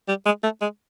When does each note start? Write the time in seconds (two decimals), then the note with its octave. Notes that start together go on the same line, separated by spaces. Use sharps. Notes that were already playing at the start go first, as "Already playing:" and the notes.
0.08 G3
0.25 G#3
0.43 A3
0.61 G#3